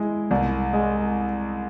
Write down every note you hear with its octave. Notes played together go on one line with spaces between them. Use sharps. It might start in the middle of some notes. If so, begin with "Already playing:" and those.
Already playing: G#3 E4
C2
G#3